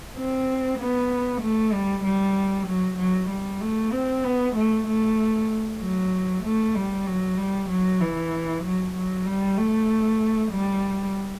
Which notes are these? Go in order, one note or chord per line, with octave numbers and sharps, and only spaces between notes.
C4
B3
A3
G3
G3
F#3
F#3
G3
A3
C4
B3
A3
A3
F#3
A3
G3
F#3
G3
F#3
E3
F#3
F#3
G3
A3
G3